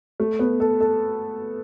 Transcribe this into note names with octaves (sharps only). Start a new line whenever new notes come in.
A3
B3
A4
A4